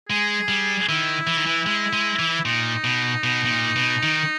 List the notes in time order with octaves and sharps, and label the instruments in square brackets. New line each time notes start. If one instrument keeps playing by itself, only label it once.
[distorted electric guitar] G#3 [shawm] G#4
[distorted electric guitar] G3
[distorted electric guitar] D#3 [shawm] E4
[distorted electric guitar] E3
D#3
E3
G#3
G#3
E3
[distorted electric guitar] A#2 [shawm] D#4
[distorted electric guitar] B2
B2
B2
A#2
B2
D#3